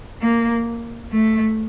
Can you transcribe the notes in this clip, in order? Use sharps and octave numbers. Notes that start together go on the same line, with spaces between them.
A#3
A3